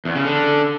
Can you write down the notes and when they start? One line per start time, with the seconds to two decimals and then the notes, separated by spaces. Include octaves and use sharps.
0.05 E2
0.15 C#3
0.25 D3